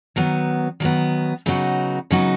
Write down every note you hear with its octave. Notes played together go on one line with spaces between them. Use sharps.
D#3 F#3 B3
D#3 F#3 B3
C#3 F#3 B3 D#4 F#4
C#3 F#3 B3 D#4 F#4